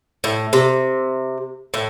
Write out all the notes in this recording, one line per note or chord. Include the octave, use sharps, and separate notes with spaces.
A2
C3
A2